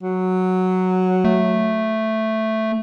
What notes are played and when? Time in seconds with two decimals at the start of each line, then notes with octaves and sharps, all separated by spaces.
0.02 F#3
1.24 A3